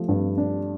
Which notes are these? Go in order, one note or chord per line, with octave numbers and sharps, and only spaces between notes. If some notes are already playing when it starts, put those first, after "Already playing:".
Already playing: F3 A3
G2
D4